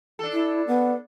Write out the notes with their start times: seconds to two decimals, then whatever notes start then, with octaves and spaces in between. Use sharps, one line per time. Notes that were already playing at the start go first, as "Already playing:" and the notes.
0.19 D4 A4
0.32 E4
0.67 B3